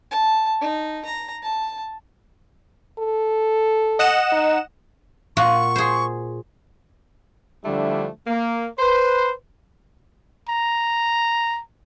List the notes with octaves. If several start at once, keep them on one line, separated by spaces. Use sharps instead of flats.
A5
D#4
A#5
A5
A4
D#5 F#5 E7
D#4
A#2 F4 F#4 C#6
G#4 C5
D3 F3 G3 A3 D4 E4
A#3
B4 C5
A#5